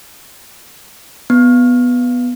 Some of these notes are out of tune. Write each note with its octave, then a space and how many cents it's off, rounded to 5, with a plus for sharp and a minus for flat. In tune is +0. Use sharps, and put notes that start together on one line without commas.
B3 +0